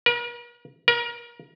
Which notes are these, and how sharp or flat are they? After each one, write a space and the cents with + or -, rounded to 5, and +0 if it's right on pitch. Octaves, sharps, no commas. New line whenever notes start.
A#4 +45
A#4 +30